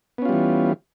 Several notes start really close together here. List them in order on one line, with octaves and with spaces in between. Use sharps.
B3 C#4 F4 G3 E3